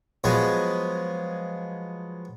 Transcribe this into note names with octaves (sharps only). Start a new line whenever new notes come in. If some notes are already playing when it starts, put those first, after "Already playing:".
F3 F#3 G#3 B3 G#4 B4